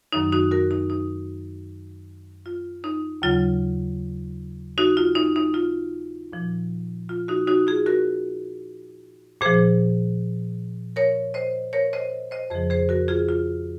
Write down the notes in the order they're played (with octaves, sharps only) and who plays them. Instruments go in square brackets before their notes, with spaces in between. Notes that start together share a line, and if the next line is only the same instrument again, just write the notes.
[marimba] F#2 D#3 F#3 D#4
D#4 F#4
F#4 A#4
D#4
D#4
F4
D#4
D#2 C#3 F#3 F4
D#4 F#4
F4
D#4
D#4
F4
A#2 F3
F4
D#4 F#4
D#4 F#4
F4 G#4
F#4 A#4
A#2 F3 G#4 C5
A#4 C#5
C5 D#5
A#4 C#5
C5 D#5
C5 D#5
F2 C#3 F3 G#4 C5
G#4 C5
F#4 A#4
F4 G#4
F4